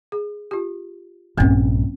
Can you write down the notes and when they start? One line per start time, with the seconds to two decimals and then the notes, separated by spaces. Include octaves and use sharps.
0.12 G#4
0.51 F4 G4
1.38 A#1 G2 A#3 C4 C#4